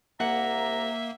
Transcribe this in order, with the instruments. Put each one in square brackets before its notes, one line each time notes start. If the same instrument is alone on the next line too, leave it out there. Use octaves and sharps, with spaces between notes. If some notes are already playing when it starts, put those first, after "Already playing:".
[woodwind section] C2 A#5 [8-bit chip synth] A#3 [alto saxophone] E5 [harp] F#5